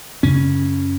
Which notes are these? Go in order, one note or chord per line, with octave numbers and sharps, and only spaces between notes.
F#2 C#3 C#4